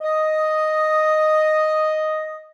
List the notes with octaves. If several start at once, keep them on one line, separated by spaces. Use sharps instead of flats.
D#5 D#6